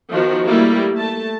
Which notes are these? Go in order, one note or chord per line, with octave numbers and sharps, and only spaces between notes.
D#3 F3 B3 F#4
G3 A3 A#3 E4 G4 A#4
A3 A5